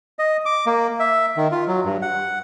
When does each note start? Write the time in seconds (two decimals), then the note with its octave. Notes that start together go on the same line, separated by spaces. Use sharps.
0.19 D#5
0.46 D6
0.66 A#3
1.00 E5
1.37 D#3
1.52 F4
1.67 F#3
1.85 G2
2.02 F#5